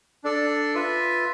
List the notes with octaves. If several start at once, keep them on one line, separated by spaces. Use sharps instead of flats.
D4 A4 D5
F4 B4 E5